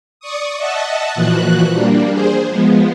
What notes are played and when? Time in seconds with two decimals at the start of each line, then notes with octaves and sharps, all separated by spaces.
0.20 D5 C#6 D#6
0.57 D#5 E5 F#5 A5
1.15 A#2 E3 F3 F#4 F#6
1.70 G3 A#3 D4
2.12 G#4 C5
2.49 F3 G#3 B3